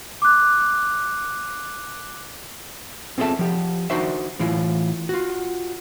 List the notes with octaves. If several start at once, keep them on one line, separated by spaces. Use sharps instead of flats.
D6 F#6
C4 F4 G#4 A4 E5 A5
F3 G4
D4 D#4 F#4 C5 E5
A2 E3 E4 F4
F4 F#4